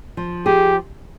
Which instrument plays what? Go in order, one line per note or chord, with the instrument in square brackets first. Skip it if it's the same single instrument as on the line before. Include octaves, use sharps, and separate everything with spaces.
[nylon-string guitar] F3
[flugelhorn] G4 [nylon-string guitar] G#4